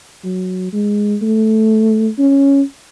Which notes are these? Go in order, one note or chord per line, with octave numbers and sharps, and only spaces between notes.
F#3
G#3
A3
C#4